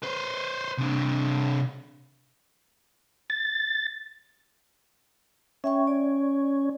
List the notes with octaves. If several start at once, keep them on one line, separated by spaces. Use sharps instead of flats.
B4 C5
C3 D4
A6
C#4 E5 G5 C#6
D5